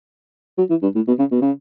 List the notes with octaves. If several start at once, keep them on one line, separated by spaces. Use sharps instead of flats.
F#3
E3
G2
A2
B2
C#3
B2
C#3